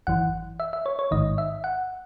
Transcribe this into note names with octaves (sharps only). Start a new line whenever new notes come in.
G#1 F#2 E3 F#5
E5
E5
C#5
C#5
A1 G#2 D#3 D#5
E5
F#5